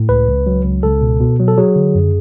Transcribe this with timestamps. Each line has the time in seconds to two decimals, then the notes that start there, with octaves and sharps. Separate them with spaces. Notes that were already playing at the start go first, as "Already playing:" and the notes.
Already playing: A2
0.09 C#2 B4
0.28 C#2
0.47 F#3
0.65 C#2
0.83 C#2 A4
1.01 B2
1.20 B2
1.39 F#3
1.48 A4
1.58 F#3 G#4
1.76 D3
1.95 F#2